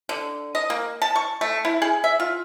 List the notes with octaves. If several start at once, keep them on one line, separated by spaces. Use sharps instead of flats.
D3
D#5
A#3
A5
C#6
A3
E4
G#4
E5
F4